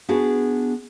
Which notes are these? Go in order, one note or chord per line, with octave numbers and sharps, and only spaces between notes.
B3 D4 F#4 G#4